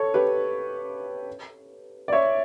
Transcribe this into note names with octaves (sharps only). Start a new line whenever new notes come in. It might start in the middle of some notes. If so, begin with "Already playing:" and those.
Already playing: A4 C#5
G4 B4
D5
C#5 E5